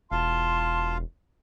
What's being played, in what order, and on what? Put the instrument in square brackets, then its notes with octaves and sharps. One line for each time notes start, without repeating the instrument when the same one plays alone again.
[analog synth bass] E1 [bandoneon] F4 F5 [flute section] A5 C6